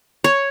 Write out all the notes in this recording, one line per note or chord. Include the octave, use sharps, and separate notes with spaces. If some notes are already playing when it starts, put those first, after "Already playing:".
C#5